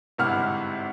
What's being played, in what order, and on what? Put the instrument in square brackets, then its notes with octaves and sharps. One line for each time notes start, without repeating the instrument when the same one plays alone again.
[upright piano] G1 G#2 C3 E4 F#5 F6